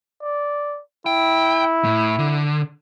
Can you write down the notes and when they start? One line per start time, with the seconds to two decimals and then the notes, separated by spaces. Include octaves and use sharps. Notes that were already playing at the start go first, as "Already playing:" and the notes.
0.22 D5
1.06 E4 G5
1.84 A2
2.19 D3